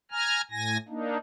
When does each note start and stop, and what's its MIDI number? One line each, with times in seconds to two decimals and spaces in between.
0.11 0.41 80
0.11 0.41 82
0.11 0.41 89
0.51 0.77 45
0.51 0.77 80
0.51 0.77 94
0.89 1.18 58
0.89 1.18 62
0.89 1.18 63